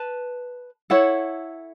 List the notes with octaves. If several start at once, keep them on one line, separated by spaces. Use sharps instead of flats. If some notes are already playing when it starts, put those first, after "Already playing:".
Already playing: B4 A5
E4 A4 C#5 F#5